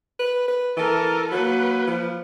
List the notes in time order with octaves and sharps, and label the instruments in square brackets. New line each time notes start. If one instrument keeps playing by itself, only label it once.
[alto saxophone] B4
B4
[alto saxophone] E3 [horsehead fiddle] A4 A#4
[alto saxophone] F#3 [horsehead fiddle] A#3 B4
[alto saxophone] F3